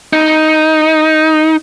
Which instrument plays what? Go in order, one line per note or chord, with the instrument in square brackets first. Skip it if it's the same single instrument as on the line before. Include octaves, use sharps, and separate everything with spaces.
[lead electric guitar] D#4